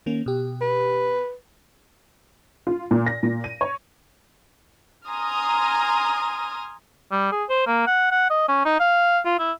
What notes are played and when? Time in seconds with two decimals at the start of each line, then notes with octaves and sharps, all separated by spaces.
0.06 D#3 A#3 C#4
0.26 B2 G4
0.61 B4
2.67 F4
2.91 A#2
3.06 A#6
3.23 A#2
3.44 D#7
3.61 C#5
5.08 G#5 A#5 C6 D#6 F6
7.12 G3
7.32 G#4
7.49 C5
7.67 A#3
7.87 F#5
8.11 F#5
8.30 D#5
8.48 C#4
8.65 D#4
8.80 F5
9.25 F4
9.39 E4